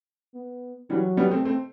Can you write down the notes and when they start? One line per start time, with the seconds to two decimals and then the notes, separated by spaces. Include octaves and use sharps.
0.35 B3
0.90 E3 F#3 G3
1.17 G3 B3
1.31 A3 C4
1.45 A3 C4